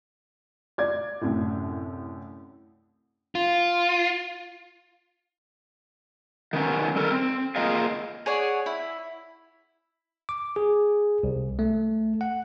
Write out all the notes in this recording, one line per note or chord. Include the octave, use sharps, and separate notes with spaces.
D5 G#6
C2 F#2 A2
F4
D#3 B3 C#4
G3 A4 A#4
C4
A#3 F4 G#4 A#4 D#5 F5
G#4 C#5 D5 F#5
E4
D6
G#4
C2
A3
F#5